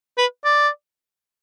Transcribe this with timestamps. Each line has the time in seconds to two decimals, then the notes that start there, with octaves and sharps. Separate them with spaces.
0.18 B4
0.45 D5